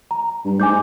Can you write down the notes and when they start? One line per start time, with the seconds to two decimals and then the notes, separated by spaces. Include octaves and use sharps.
0.11 A#5
0.45 G2
0.60 G#2 G#5 D6 G6